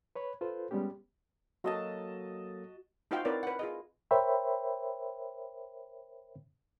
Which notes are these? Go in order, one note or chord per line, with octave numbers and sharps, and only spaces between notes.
B4 C#5 B5
F4 A4 B4 C5
G3 G#3 B3 C#4 G4
F#3 A#3 F#4 A4 D#5 A5
D#4 F4 F#4 C5 F5 G5
C4 E4 A#4 B4 C#5 D5
B4 F#5
F4 G#4 D#5
A#4 C5 C#5 E5 G5 B5